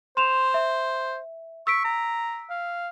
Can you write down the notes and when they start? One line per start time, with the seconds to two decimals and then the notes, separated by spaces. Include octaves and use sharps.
0.17 C5 C6 E7 F7
0.54 E5
1.67 C#6 E6 B6 D7
1.84 A#5
2.50 F5